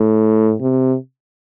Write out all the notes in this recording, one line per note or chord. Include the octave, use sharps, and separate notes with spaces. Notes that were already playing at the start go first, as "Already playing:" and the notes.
Already playing: A2
C3